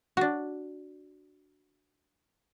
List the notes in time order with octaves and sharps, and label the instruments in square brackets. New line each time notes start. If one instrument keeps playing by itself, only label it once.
[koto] D4 F#4